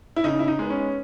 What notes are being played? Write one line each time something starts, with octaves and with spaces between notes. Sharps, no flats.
E4
C#3 D#4
E4
D#4
G#3 B3
C#4